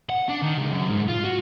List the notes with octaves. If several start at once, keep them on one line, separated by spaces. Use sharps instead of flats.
F#5
D4
D#3
C#2
F#2
G#2
F4
F#4